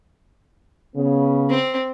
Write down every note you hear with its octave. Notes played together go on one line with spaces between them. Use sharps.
C#3 B3
C4